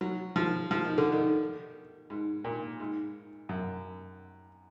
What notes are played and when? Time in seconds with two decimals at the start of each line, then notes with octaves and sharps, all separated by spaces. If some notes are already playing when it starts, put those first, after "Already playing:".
0.01 F#3
0.36 F3
0.71 F3
0.85 D#3
0.98 D3
1.12 D#3
2.10 G#2
2.44 A#2
2.80 G#2
3.49 F#2